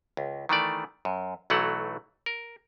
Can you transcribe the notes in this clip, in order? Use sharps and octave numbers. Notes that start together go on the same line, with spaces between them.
C#2
D#3 E3 A3 D5
F#2
B1 E3 F#3 A3 F#5
A#4